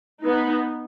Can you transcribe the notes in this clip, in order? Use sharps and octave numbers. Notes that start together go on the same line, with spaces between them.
B3 D#4